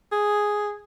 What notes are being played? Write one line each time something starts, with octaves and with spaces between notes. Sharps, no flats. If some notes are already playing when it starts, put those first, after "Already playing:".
G#4